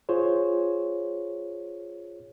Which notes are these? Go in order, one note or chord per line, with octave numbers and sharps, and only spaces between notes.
F4 G#4 C5 C#5